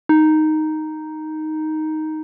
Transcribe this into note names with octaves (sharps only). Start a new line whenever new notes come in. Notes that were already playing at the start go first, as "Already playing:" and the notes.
D#4